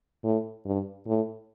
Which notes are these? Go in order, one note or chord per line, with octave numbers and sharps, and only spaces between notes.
A2
G2
A2